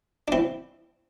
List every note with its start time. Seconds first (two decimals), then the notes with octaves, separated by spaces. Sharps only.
0.28 D4
0.32 C4 E4